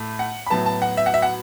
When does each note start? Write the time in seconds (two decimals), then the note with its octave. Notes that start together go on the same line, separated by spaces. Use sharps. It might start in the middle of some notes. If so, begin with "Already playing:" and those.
Already playing: A2 A3
0.19 F#5
0.47 B5
0.50 A2 F#3 B3 A5
0.66 A5
0.82 F#5
0.97 E5
1.06 F#5
1.14 E5
1.22 F#5